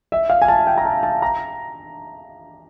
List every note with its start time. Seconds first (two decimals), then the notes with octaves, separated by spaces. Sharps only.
0.12 E5
0.30 F5
0.42 G#5
0.48 A5
0.67 G5
0.78 A#5
0.85 A5
1.03 A5
1.22 A#5